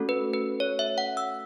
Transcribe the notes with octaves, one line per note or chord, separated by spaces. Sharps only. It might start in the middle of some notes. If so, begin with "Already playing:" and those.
Already playing: A3 C#4 F#4 A4
B4
B4
C#5
E5
F#5
E6